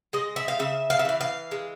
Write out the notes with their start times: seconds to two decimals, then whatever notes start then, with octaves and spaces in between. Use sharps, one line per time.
0.13 G#3 D#5
0.36 E5
0.48 F5
0.59 C#3 E5
0.90 F5
0.99 E5
1.05 E3 F5
1.21 F5
1.51 G#3